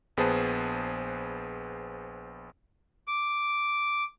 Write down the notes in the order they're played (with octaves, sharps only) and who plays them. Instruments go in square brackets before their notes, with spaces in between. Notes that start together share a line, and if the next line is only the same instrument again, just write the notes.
[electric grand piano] A#1 B3 G#4 B4 C5 A5
[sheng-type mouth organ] D6